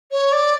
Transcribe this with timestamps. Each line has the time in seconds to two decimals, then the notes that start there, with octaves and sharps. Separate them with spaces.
0.11 C#5
0.32 D5